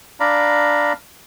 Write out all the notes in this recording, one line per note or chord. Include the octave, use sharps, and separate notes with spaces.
D4 D5 F5 A#5 B5